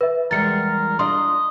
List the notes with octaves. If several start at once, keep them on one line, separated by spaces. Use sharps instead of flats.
B4 E5
E2 G3 G#3 A#4 A6 C#7
D4 F4 D#5 C6